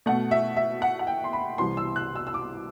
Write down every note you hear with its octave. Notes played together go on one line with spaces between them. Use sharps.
B2 A3 F#5
E5
E5
F#5
F#5
G5
C6
B5
C2 C3 E3 C6
E6
F#6
E6
E6
D6